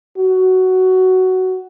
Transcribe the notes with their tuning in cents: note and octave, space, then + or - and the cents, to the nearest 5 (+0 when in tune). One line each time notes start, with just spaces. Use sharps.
F#4 +10